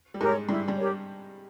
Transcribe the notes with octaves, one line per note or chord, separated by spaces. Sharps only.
G3
G#2 G#3 G4 A#4 C#5
G2 G3 E4
G2 G3
G4 A#4 C#5